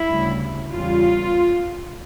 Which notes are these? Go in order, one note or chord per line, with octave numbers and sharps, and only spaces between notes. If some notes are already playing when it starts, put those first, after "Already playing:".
Already playing: E4
D2 C#3 G3
E2 C#3 G3 F4